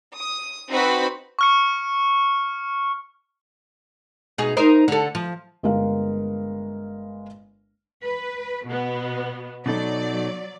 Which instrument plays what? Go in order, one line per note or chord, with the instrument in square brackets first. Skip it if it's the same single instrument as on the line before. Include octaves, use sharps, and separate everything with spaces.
[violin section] D#6
C4 D#4 F#4 B4 C5 B5
[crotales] C#6 F6 C#7
[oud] B2 D#4 G#4
D#4 A#4 C5
D3 A4
F3
[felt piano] G1 G#3 A#3 A#4 F5
[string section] B4
B2 B3
[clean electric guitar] B2 D#4 A4 [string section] F#3 D5